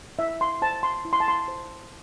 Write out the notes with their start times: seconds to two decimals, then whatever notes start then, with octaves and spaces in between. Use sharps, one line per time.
0.19 E4 E5
0.41 C6
0.62 C5 A5
0.83 C6
1.05 E4
1.13 C6
1.20 A5
1.28 C6
1.48 C5